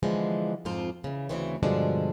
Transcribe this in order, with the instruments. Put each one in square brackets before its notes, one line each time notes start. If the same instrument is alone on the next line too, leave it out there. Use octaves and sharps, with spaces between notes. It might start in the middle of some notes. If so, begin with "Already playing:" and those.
[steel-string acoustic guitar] D3 E3 F3 G#3 B3
F2 G#2 F3 C4 F4
C#3 E3
D2 G2 C#3 E3 C4 C#5
G2 B2 D3 F3 G#3 D4